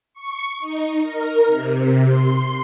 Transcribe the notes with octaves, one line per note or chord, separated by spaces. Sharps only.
C#6
D#4
A#4
C3
C6